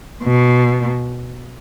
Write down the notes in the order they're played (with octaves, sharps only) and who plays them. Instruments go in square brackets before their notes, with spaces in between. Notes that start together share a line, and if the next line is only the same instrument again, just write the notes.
[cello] B2